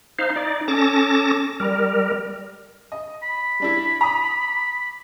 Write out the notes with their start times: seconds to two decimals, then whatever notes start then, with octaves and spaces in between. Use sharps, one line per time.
0.19 D#4 C5 F5
0.36 D#4 D5
0.68 C#4 A4 A5 D6 A#6
1.60 G3 A#4
2.92 D#5
3.23 B5
3.60 G3 D4 E4
4.01 A#5 D6 D#6